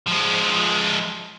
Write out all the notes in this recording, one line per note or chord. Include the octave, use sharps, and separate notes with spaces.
F3 G#3